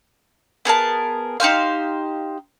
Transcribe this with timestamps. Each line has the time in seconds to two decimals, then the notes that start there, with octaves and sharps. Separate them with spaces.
0.65 B3 G#4 A#4 A5
1.40 D#4 G4 C5 F5